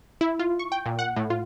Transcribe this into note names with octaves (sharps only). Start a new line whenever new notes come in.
E4
F4
C#6
G5
A#2
F#5
A2
F4